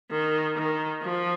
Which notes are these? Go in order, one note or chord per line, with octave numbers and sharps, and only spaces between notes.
D#3
D#3
F3